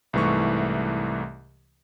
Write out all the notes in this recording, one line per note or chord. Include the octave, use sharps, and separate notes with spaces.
C2 G#2 E3 A3 C#6